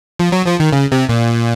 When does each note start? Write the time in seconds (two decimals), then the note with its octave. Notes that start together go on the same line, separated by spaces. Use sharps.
0.19 F3
0.32 F#3
0.46 F3
0.60 D#3
0.73 C#3
0.92 C3
1.09 A#2